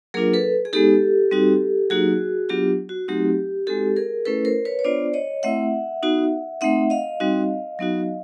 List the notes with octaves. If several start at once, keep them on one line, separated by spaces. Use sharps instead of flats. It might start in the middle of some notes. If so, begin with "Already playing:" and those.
F#3 A#3 D4 F4 G#4 A#4
A4 B4
G#4
G#3 B3 D#4 G4 A4
G3 C4 D#4 F#4
F#3 A#3 D#4 F#4 G#4
F#3 B3 D4 F4 G4
F#4
F#3 A3 C4 D#4 F#4 G4
G#3 C4 D#4 F#4 G4 A4
G#4 A#4
A3 C#4 E4 A4 B4
A#4 C5
B4 C#5
C#5
B3 D4 F4 C5 D5
C#5 D#5
A3 C4 E4 E5 F#5
B3 D#4 F#4
A3 C4 D#4 E5 F#5
D#5 F5
G3 C4 D#4 F#4
F#3 B3 D#4 F#4